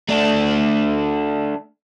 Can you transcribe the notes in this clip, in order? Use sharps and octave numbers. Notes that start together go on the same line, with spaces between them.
A3 D4